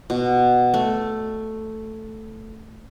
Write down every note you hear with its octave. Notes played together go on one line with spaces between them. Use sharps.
B2
A3